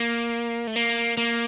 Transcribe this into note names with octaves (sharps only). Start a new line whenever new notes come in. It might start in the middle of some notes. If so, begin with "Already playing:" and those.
Already playing: A#3
A3
A#3
A#3